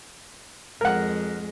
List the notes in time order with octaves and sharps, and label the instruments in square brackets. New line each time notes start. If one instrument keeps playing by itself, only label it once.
[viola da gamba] F2 G#3 [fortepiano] A#4 F#5